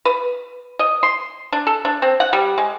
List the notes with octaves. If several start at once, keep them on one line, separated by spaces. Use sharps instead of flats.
B4
D#5
C6
D4
A4
D4
C4
F#5
G3
G#3